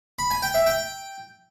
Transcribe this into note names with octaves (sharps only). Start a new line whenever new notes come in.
B5
G#5
G5
E5
G5